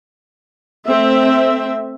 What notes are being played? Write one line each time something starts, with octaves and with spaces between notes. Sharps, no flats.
A3 C4 E5